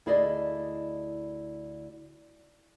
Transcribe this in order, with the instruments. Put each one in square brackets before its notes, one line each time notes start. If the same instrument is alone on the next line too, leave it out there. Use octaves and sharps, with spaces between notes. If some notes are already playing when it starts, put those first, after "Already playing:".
[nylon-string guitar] D2 E4 G#4 D5 D#5